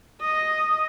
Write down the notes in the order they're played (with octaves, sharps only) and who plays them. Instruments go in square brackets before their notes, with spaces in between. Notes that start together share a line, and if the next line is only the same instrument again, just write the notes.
[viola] D#5